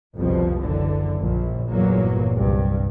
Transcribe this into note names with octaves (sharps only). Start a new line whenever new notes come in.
G1 C2 F2 B2 F3
F#1 F#2 D3 E3
A#1
G1 E2 A#2 E3 F#3 A#3
C2 G2